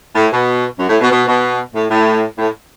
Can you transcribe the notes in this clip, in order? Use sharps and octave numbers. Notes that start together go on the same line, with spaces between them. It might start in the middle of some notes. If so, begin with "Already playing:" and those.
A2
B2
F#2
A2
B2
B2
B2
A2
A2
A2